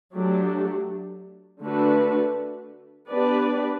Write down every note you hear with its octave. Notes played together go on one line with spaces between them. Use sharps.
F#3 A3 D4 G4
D3 A3 D4 F#4 B4
B3 D4 G4 B4 D5